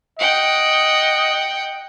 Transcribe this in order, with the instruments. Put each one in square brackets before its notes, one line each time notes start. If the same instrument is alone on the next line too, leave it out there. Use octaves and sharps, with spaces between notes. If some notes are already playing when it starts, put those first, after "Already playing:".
[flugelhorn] D#5 [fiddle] F#5 G5